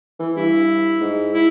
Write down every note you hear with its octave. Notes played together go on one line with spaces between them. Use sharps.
E3
G2 E4
G#2
E4